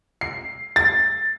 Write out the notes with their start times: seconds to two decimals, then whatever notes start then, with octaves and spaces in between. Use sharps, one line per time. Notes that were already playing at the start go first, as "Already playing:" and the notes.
0.21 C7
0.76 A6